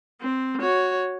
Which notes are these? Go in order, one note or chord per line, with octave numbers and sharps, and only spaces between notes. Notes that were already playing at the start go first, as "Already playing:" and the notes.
C4
F#4 C#5